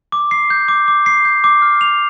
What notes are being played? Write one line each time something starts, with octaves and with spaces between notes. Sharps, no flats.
D6
C7
G6
D6
D6
C7
G6
D6
F6
F7